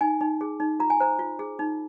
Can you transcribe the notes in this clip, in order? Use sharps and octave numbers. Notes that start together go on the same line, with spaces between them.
D#4 G#5
D#4
G#4
D#4
F4 A#5
G#5
C5 A#5
F4
G#4
D#4